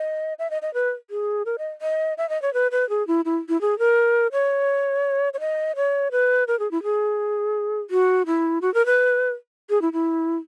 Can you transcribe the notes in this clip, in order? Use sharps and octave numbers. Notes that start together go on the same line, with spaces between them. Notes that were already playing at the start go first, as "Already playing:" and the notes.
Already playing: D#5
E5
D#5
D#5
B4
G#4
A#4
D#5
D#5
E5
D#5
C#5
B4
B4
G#4
E4
E4
E4
G#4
A#4
C#5
C#5
D#5
C#5
B4
A#4
G#4
E4
G#4
F#4
E4
F#4
A#4
B4
G#4
E4
E4